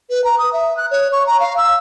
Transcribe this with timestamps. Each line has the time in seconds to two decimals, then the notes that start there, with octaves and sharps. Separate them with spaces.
0.10 B4
0.24 A#5
0.39 D#6
0.53 E5
0.77 F#6
0.91 C#5
1.13 C#6
1.27 A#5
1.40 F5
1.57 E6